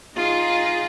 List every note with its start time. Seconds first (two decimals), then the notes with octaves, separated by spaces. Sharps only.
0.14 D#4 F4 G#4